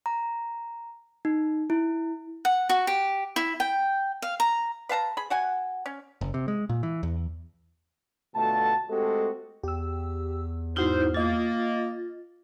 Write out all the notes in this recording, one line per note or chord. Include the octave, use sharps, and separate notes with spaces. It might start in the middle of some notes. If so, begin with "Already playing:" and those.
A#5
D#4
E4
F#5
F#4
G4
E4
G5
F5
A#5
B4 F5 A5 A#5
G#4 B5
F#4 F#5 G#5
C#4
F#1
C3
G#3
A#2
E3
E2
B2 D3 A3 F4 F#4 A5
G#3 A3 C4 F#4 G4 A4
E2 G4 E6
G#2 D#4 E4 F#4 C5 F6
A#3 F4 D#5 A6